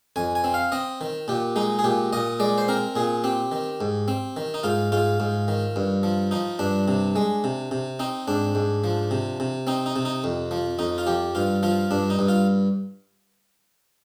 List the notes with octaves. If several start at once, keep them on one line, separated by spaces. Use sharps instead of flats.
F2 G#5
G#5
C4
F5
C4 D#5
D#3
A#2 G4
G#3 D#4
G#4
A#2 G4
A#2 D#5
G#3 D5
C5
C4 A#4
A#2 G#4
C4 G4
D#3
G#2
C4
D#3
D#4
G#2 F4
G#2 F4
G#2
D#3
G2
F3
F3 D#4
G2 D4
C3
G#3
C3
C3
C4 D#4
G#2 D4
G#2
F3
C3
C3
C4 D#4
D#4
C3
D#4
F2
F3
F2 D#4
F4
F3 G4
G2 F4
F3 F4
G2 D4
D#4
G2
F4